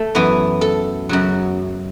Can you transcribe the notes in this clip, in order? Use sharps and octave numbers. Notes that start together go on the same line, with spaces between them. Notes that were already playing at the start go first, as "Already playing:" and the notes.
Already playing: A3
F#2 E3 B3
A4
F#2 C#3 F#3